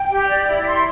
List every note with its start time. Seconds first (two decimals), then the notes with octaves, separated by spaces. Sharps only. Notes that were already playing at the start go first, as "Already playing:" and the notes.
Already playing: G5
0.11 G4
0.28 D5
0.48 E4
0.66 C6